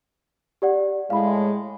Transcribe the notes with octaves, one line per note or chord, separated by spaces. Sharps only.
G4 D5 F#5
A2 G#3 F5 B5